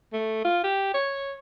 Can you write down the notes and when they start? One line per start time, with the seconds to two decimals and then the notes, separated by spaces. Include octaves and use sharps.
0.13 A3
0.44 F4
0.64 G4
0.94 C#5